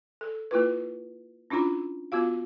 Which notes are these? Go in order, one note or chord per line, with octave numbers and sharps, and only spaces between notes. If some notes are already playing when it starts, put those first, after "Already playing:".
A4
A#3 E4 F4 B4
C#4 D4 E4 F4 A#5
B3 F4 F#4 F5